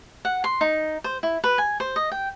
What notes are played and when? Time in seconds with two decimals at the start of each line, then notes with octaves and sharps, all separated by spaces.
0.25 F#5
0.44 C6
0.61 D#4
1.04 C5
1.23 E4
1.44 B4
1.58 G#5
1.80 C5
1.96 D#5
2.11 G5